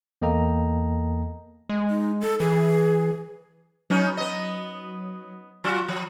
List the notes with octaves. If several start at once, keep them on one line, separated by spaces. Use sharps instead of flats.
E2 A#3 A4 D#5 G5 A#5
G#3
D#4
A4
E3 G#4
F#3 B3 C#4 D#4
B3 D#5
F#3 F4 F#4
F3